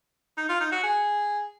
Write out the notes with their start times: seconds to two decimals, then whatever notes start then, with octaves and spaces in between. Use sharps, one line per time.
0.38 D#4
0.49 F4
0.60 D#4
0.72 F#4
0.83 G#4